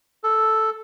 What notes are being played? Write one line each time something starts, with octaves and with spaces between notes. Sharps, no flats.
A4